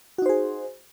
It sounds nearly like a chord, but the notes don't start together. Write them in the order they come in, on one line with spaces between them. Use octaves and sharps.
F#4 D#4 C5 G#4